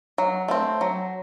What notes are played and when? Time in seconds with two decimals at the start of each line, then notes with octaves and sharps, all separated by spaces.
0.18 F#3
0.48 A3 C4
0.81 F#3